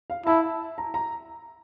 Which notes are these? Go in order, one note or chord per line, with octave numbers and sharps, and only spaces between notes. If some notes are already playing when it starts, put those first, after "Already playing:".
F5
E4 A5
A#5
A#5